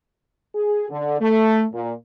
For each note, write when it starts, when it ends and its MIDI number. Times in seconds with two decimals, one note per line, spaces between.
0.55 0.89 68
0.90 1.17 50
1.20 1.64 57
1.74 1.92 46